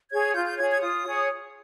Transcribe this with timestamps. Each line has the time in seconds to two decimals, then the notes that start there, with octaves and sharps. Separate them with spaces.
0.11 G#4 C#5 G#6
0.34 F4 G6
0.46 G6
0.58 G#4 C#5 G#6
0.70 G#6
0.81 F4 D#6
1.05 G#4 C#5